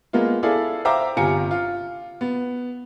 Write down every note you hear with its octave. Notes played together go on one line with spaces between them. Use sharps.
G#3 A#3 B3 F4
E4 G#4 A4 D5 F5
C5 E5 F5 G5 A#5 D6
G1 C3 F4 G#5 A#5 C#7
F4
B3